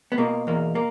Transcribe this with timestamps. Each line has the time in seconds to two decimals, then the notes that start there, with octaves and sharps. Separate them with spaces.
0.12 B3
0.18 B2 A#3
0.47 E2 A#3
0.75 A#3